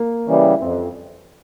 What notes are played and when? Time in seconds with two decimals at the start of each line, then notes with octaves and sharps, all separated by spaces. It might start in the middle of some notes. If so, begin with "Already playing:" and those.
Already playing: A#3
0.27 C#3 E3 G3
0.61 F2 C4